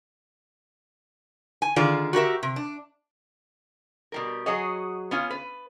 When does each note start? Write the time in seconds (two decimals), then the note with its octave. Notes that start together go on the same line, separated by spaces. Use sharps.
1.62 G#5
1.76 D3 D#3 F4 G#4 D5
2.13 F#4 G4 A#4 E5
2.43 C3
2.56 D4
4.12 B2 G3 A#4
4.46 F#3 F#4 G#4 C#5 D#5
5.11 B3 C#4 F4
5.31 B4